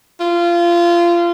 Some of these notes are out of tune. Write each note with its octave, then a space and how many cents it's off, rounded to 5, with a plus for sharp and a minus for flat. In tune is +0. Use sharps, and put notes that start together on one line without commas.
F4 -20